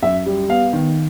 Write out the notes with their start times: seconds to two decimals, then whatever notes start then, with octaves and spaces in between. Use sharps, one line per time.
0.02 F#2 E5
0.26 G3
0.49 B3 F5
0.73 D#3